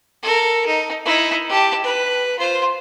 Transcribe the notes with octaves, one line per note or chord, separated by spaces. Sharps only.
A4 A#4
D#4
D#4 E4
G4 A5
B4
F4 C5